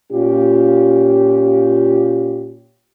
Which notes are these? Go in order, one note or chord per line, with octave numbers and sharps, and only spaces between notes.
A#2 C#4 F4 G4